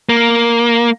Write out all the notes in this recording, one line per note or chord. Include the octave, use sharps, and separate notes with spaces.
A#3